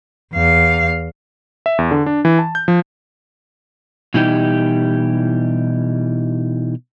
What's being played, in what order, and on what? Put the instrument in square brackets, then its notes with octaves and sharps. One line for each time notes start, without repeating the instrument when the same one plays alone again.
[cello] E2 F5
[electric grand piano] E5
E2
D3
D4
E3
A5
G6
F3
[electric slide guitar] B2 E3 G3 D#4 E4 G4